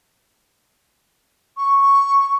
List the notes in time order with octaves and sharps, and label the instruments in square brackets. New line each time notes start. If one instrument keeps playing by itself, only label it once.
[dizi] C#6